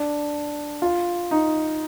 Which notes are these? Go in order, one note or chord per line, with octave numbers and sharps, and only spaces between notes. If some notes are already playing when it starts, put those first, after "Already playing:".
Already playing: D4
F4
D#4